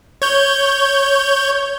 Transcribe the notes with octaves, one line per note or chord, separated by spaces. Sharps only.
C#5 G6